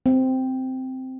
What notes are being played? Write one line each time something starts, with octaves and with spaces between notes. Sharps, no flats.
C4